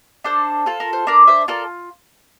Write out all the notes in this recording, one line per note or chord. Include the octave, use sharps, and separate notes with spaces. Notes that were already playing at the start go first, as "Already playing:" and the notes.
D4 A4 C5
F4 A4
A#4
C5
D4 A#4 D5
C5 E5
F4 A4 A#4 D5